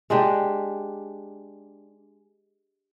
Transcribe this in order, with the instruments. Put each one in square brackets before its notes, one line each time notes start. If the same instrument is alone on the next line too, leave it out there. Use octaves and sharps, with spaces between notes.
[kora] G#3 D4 G4